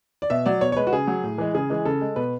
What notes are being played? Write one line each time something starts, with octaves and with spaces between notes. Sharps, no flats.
D5
B2 E5
F#3 D5
B2 C#5
C#5
G#3 B4
F#4
C#3 G#4
F#3
A2
E3 G#3
C#3 G#4
E3 G#3
C#3 A4
G#3
B2 B4